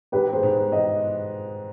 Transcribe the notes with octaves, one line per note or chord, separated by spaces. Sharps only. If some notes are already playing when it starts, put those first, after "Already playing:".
G#2 G4 B4
G#4 C5
G#2
D#5